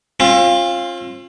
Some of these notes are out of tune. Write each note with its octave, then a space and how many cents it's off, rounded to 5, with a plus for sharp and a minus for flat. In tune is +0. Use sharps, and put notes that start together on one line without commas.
C4 +45 F4 +0